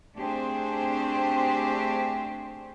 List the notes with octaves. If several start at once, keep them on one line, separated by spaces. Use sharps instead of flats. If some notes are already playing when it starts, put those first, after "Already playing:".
A3 C4 D4 G4 G#4 C5